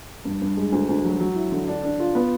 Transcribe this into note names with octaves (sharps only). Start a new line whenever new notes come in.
G2
G2
G#3
D2
D2
F#3
F#3
E4
D3
D4
D4
F4
B3